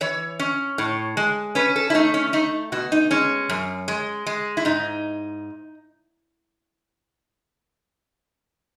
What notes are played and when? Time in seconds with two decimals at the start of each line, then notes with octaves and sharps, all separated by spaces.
0.01 E3 C#5
0.39 C#4
0.78 A2
1.17 G#3
1.55 C#4 B4
1.76 A4
1.90 E4
1.94 A3 D#4
2.14 C#4
2.33 A3 D#4
2.72 B2 F#4
2.92 D#4
3.11 G#3 C#4
3.50 F#2
3.88 G#3
4.26 G#3
4.57 E4
4.65 G#2 D#4